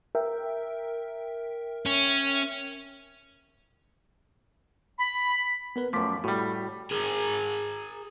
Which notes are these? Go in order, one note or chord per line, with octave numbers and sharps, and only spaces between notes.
A#4 E5 G5
C#4
B5
B3 A#4 B4
F#2 F3 A3 D6 B6
A2 G3 F#4
G#4 A#4